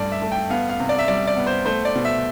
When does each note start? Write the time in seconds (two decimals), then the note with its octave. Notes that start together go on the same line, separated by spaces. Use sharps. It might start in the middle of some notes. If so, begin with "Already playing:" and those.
Already playing: G2 A3 D5
0.12 E5
0.22 A3
0.32 G5
0.50 B3 F5
0.69 F5
0.80 C3
0.89 D5
0.99 E5
1.08 G3 D5
1.27 D5
1.37 B3
1.47 C5
1.66 A3 C5
1.85 D5
1.95 B2
2.05 E5